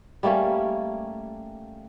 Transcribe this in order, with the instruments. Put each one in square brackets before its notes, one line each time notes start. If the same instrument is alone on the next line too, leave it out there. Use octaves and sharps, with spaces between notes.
[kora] G3 A3 A#3 C#4